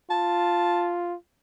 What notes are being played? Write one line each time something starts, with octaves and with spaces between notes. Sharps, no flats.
F4 A5